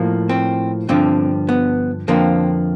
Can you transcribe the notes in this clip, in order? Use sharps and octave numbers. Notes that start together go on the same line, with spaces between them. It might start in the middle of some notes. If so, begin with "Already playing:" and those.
Already playing: A2 F3 A#3
C4
G2 D3 F3 C4
B3
F2 D3 F3 A#3 C4